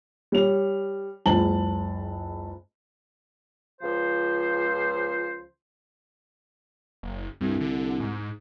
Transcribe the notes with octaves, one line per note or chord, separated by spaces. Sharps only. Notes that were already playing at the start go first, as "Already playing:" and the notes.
G3 C#5 F7
F#1 C#2 A5 F#7
C#2 F3 C5
F#1
C2 G2
D3
G#2